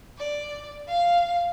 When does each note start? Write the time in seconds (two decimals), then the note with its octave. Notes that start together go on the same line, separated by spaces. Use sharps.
0.17 D5
0.88 F5